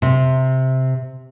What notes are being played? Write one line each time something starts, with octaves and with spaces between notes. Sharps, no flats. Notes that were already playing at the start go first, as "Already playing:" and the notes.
C3